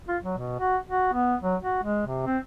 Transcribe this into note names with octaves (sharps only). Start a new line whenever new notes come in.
F4
F#3
B2
F#4
F#4
B3
F#3
F#4
G#3
C3
C4